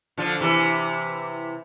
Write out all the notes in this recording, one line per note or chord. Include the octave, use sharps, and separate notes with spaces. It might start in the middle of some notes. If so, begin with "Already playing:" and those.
D3 F3
C3 E3